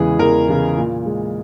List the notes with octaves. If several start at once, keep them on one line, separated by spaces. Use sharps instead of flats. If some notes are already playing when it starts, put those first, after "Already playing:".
Already playing: E2 C#3 E3 G#3 G#4
E2 A#4
C#3 E3 G#3
A#2
G#3